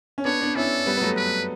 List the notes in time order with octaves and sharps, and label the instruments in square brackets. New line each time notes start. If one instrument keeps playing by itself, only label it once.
[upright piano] C#4
[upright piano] B3 D4 [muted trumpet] C#5
[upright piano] B3 D4
[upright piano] C#4 E4 [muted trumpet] A4
[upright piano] G3 B3
B3
F#3 A3
[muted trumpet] B4